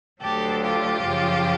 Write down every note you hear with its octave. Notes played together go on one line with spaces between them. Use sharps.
D2 D3 F#3 G4 A4
F4 G4
F#2 C#3 F3